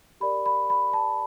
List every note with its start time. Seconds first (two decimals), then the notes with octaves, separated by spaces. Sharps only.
0.20 G4 A#4 D5 B5
0.46 B5
0.70 B5
0.93 A5